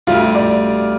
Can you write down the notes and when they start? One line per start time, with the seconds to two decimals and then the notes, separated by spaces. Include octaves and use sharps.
0.07 D2 C3 G3 F4
0.35 D5